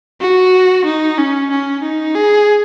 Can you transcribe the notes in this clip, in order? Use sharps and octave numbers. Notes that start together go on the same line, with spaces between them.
F#4
D#4
C#4
C#4
D#4
G#4